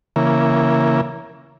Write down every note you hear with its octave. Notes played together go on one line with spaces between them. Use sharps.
C#3 E3 A#3